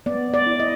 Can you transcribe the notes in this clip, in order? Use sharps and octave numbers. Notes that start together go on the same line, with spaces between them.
B3 D5
D5
E4
D#5